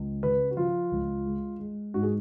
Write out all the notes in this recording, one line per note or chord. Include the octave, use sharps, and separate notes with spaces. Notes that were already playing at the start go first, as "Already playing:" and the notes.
Already playing: C#2
C#3 B4
F#4
F3 F4
C#2
G#3
G#3
G#2 F#4
G#4